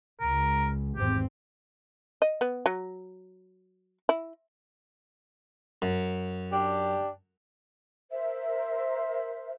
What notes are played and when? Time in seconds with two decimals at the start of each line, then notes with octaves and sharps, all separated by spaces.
0.21 C#2 A#4
0.96 G#1 E2 C4 G4
2.22 D#5
2.41 B3
2.66 F#3
4.09 E4
5.82 F#2
6.53 D4 G4
8.11 A#4 C5 E5